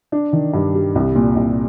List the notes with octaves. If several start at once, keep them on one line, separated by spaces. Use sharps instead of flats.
D4
D#3
G2
G3
C2
A#2
C2